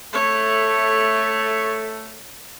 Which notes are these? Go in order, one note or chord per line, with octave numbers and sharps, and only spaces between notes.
A3 C#5